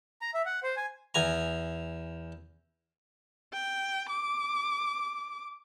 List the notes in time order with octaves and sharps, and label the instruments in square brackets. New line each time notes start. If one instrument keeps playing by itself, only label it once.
[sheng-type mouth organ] A#5
E5
F#5
C5
G#5
[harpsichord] E2 G#5 A#5
[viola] G5
D6